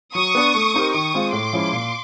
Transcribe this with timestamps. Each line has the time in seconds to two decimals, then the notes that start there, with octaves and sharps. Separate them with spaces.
0.15 F#3 C#6 D#6
0.35 B3 D4
0.55 A3
0.74 C4 D#4 G4 A#4
0.94 D#3 C#6 D#6
1.14 G#3 C4 F4
1.33 A2 C6 D6
1.53 F3 G#3 C#4 E4
1.73 A#2